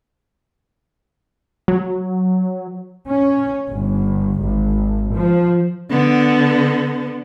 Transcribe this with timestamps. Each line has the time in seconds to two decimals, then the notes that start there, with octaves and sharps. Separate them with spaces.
1.68 F#3
3.07 C#4
3.68 G1
4.42 G#1
5.13 F3
5.90 D3 B3